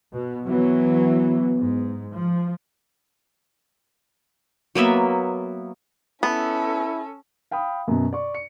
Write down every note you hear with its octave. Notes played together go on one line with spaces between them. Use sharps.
B2
E3 F#3 B3
G#2
F3
F#3 A#3 B3 E5
B3 C#4 E4 A4
F5 G5 B5 D#6
F#2 B2
D5 C#6
C#7